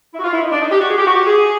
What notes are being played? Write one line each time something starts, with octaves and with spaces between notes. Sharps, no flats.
E4
F#4
F4
E4
D#4
D4
D#4
G4
F#4
G#4
G4
F#4
G4
G#4